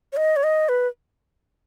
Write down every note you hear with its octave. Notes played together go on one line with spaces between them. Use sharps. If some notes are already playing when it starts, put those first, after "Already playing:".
C#5
D#5
C#5
D#5
B4